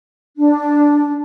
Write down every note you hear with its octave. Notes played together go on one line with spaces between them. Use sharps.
D4